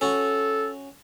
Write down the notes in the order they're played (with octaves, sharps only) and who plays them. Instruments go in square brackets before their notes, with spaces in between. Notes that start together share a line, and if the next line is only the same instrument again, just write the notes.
[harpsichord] C#4 F#4 [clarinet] A4